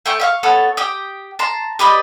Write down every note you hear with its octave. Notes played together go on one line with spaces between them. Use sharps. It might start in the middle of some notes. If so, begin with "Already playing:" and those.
A3 G5 C#6
E5 F5 C#6
B3 A4 C#5
G4 G5 D#6
A5 A#5 C6
G4 B4 D5 D#5